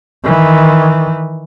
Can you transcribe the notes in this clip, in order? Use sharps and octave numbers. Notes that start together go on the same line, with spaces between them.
D#3 E3